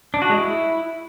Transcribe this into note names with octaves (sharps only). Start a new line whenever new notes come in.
D4
F#4
G#3
E4